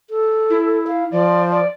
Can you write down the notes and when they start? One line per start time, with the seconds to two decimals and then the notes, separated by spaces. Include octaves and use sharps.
0.10 A4
0.50 E4
0.88 F5
1.12 F3 D5
1.52 D5